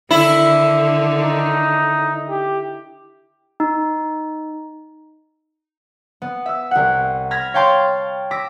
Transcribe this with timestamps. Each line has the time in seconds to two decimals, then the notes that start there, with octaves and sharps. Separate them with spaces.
0.11 D3 D#3 E4
1.23 D#4
2.30 G4
3.60 D#4
6.22 B3
6.46 E5 E6
6.71 C2 F#5
7.31 B5 F6 G#6 A#6 B6
7.54 C#5 F5 G5 A5 C6
8.31 D6 E6 A#6 B6